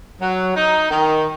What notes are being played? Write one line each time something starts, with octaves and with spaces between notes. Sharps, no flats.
F#3
D#4
D#3